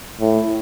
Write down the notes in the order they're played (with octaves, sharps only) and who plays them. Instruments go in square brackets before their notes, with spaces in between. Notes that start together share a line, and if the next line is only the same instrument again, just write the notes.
[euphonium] A2